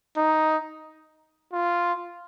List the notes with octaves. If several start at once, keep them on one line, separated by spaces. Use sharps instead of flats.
D#4
F4